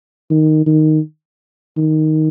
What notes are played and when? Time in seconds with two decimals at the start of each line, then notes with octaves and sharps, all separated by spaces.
0.30 D#3
0.66 D#3
1.77 D#3